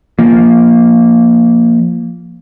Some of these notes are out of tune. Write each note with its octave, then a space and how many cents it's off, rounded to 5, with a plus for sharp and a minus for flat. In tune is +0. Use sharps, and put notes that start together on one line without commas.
F3 -10 A#3 +0